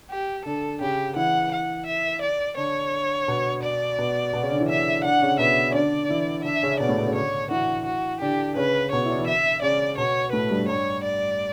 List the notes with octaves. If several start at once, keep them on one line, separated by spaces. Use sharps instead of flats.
G4
D3 D4 A4
C#3 C#4 G4
E3 E4 F#5
F#5
E5
D5
D3 D4 C#5
B2 B3
D5
B2 B3
B2 B3
C#3 C#4
D3 D4
E3 E4
D3 D4 E5
D3 D4 F#5
C#3 C#4
B2 B3 E5
C#4
D3 D4 D5
E3 E4
D3 D4 E5
C#3 C#4
B2 B3 D5
A2 A3
B2 B3
C#3 C#4
D3 D4 C#5
E3 E4 F#4
F#4
D3 D4 G4
C#3 C#4 B4
B2 B3 C#5
E4
D3 D4
E3 E4
E5
C#3 C#4 D5
B2 B3 C#5
A2 A3 B4
G2 G3
G2 G3 C#5
D5